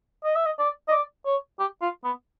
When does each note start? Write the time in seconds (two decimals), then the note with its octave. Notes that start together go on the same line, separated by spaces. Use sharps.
0.24 D#5
0.36 E5
0.46 D#5
0.59 D5
0.88 D#5
0.91 D5
1.26 C#5
1.60 G4
1.82 F4
2.04 B3